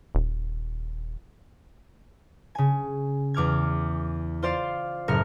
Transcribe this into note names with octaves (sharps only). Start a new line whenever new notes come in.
D#1
C#3 G#5
E2 D6 F6 G#6
F4 C5 D5 F5
F#1 A2 A#4 F6 C#7